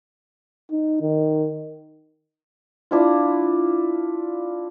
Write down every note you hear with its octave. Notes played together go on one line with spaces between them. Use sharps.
D#4
D#3
D4 E4 F4